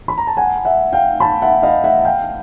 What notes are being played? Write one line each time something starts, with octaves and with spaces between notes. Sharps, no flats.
B5
A#5
A5
F#5 G#5
E5 F#5
F5 G5
A5 B5
E5 F#5
D#5 F5
E5 F#5
F5 G5